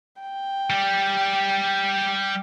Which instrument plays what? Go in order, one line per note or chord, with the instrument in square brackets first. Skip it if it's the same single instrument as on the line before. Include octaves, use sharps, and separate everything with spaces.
[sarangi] G5
[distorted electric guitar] G3 G4